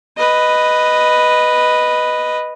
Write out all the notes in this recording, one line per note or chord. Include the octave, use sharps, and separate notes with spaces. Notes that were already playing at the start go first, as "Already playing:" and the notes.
B4 D#5